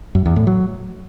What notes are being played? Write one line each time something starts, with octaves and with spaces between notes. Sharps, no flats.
F#2
E2
A2
F#3